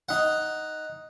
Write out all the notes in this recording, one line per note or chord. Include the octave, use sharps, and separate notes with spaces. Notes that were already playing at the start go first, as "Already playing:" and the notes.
D#4 F#5